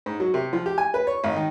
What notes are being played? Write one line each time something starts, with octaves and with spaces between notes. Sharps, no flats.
G#2
F#3
C3
F3
G4
G#5
B4
C#5
G#1
D#3